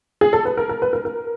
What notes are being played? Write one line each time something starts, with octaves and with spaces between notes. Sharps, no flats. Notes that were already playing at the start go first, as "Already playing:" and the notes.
G#4
A4
B4
A#4
A#4
B4
A#4
A#4